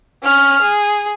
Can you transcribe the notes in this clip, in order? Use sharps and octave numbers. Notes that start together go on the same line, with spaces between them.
C#4 F6
G#4